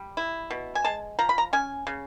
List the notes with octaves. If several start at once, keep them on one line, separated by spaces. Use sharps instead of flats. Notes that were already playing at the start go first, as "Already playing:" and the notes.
Already playing: G3
E4
B2
G#5
G#3 A5
F3 A#5
B5
A#5
C#4 G#5
C#3